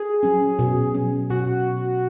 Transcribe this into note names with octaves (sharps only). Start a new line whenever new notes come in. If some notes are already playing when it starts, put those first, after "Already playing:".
Already playing: G#4
F#3 C#4
B2
F#3 C#4
B2 F#4